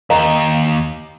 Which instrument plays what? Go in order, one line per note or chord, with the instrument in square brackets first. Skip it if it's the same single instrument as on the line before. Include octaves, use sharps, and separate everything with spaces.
[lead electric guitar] D#2 [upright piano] D#5 [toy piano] F5 A#5